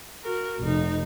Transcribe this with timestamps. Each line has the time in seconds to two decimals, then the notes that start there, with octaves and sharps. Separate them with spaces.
0.24 F#4 A#4
0.63 F1 D#4